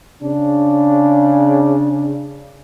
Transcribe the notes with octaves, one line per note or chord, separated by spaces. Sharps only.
C#3 D4